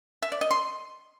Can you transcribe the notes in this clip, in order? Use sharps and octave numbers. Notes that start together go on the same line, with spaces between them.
E5
D5
D#5
C6